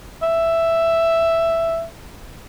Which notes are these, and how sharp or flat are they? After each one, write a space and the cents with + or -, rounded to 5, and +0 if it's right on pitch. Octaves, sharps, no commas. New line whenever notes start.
E5 +5